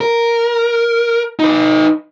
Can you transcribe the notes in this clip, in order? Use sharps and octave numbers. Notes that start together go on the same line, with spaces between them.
A#4
D#4 B4